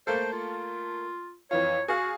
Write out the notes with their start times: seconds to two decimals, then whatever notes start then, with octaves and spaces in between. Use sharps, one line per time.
0.07 A3 A#3 A4 C5
0.33 F4
1.51 F2 E3 F4 C#5
1.88 F#4 G#4 F5